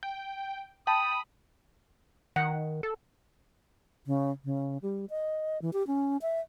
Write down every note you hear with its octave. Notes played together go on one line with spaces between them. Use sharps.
G5
G5 A5 B5 D#6
D#3 F#5
A4
C#3
C#3
G3
D#5
E3
G4
C#4
E5